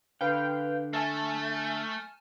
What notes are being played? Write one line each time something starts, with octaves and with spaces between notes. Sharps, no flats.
D3 B4 F5 G5
A3 E5 G#5 A5 F6